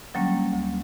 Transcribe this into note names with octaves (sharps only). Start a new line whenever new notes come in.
D3 F#3 G3 A#3 C#4 D4
D2